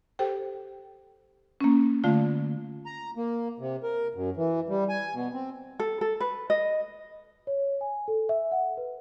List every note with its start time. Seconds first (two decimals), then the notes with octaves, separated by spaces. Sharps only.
0.19 G4 A4 C5 G5
1.61 A#3 C#4
2.04 D3 A3 F4 D5 F5
2.86 A#5
3.17 A#3
3.59 C3
3.83 A#4
4.15 F#2
4.37 E3
4.69 G3
4.89 G#5
5.14 B2
5.33 C4
5.80 A4
6.01 A4
6.20 B4
6.50 D#5
7.47 C#5
7.81 G#5
8.08 A4
8.29 E5
8.52 F#5
8.77 B4